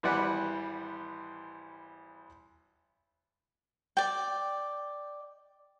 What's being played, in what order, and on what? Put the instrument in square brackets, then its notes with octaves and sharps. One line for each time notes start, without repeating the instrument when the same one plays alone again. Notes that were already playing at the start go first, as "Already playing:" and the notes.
[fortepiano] G#1 E3 G3 B4 D5 F#5
[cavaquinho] D5 G5